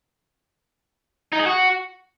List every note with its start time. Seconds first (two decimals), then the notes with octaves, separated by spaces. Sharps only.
1.32 D#4
1.39 G#4
1.46 F#4